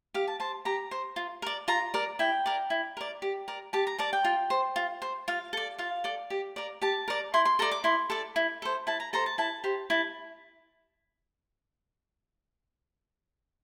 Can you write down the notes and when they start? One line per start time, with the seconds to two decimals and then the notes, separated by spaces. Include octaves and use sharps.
0.14 G4 F5
0.27 A5
0.40 C5 A5
0.65 G4 A#5
0.91 C5
1.16 F4
1.42 A#4 D5
1.68 F4 A#5
1.94 A#4 D5
2.19 E4 G5
2.46 A#4 D5
2.70 E4
2.97 A#4 D5
3.22 G4
3.48 A#4 D5
3.73 G4 A5
3.87 A#5
3.98 A#4 D5 A5
4.13 G5
4.24 F4
4.50 C5
4.76 F4
5.02 C5
5.28 F4 F5
5.53 A4 D5
5.78 F4 F5
6.04 A4 D5
6.30 G4
6.56 A#4 D5
6.82 G4 A5
7.08 A#4 D5
7.34 E4 C6
7.45 C6
7.59 A4 D5 A#5
7.71 D6
7.84 E4 C6
8.10 A4 D5
8.36 E4
8.62 A4 C5
8.87 E4 A5
9.00 A#5
9.13 A4 C5 A#5
9.26 A5
9.38 E4 A5
9.64 G4 C5
9.90 E4 A5